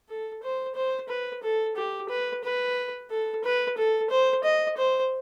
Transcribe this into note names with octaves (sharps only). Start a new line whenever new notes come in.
A4
C5
C5
B4
A4
G4
B4
B4
A4
B4
A4
C5
D#5
C5